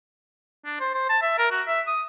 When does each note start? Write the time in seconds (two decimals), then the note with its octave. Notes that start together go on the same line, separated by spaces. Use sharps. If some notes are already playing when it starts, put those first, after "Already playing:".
0.65 D4
0.80 C5
0.94 C5
1.09 A5
1.22 E5
1.38 A#4
1.51 F#4
1.67 E5
1.87 D#6